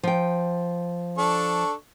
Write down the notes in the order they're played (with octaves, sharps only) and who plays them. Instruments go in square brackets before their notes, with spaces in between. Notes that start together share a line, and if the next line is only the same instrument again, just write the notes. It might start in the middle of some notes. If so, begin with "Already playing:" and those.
[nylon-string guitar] F3 G5
[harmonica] D4 A4 C#6